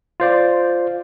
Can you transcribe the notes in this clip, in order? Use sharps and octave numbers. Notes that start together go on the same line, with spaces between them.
F4 C5 D5